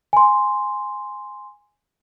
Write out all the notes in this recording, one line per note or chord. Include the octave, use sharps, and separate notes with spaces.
G#5 C6